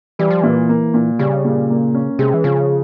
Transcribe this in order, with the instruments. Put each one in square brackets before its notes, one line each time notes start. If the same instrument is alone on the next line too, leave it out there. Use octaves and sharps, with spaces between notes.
[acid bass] E3 [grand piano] G3
[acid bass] F3
[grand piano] A#2 [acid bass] E3
[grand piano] A#3
A#2
[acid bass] C#3 [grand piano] G3
[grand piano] A#2
A#3
C#4
[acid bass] C3 [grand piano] G#3
[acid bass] E3
[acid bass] C#3 [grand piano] F3